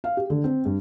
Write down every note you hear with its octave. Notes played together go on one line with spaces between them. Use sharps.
F5
G4
D3
C4
G2